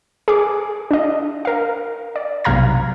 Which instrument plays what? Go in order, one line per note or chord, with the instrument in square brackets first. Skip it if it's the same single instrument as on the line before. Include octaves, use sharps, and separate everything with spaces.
[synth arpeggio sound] G#4 D6
D4 D#5
A#4 F5
D5
B1 G2 C3 F5 A#5 G#6